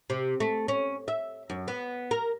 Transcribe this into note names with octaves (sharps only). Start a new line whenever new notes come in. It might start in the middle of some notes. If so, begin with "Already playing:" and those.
C3
A3
C#4
E5
F#2
B3
A#4